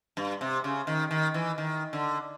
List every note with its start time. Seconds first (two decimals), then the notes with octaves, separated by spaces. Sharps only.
0.17 G2
0.41 C3
0.64 C#3
0.87 D#3
1.11 D#3
1.34 E3
1.58 D#3
1.93 D3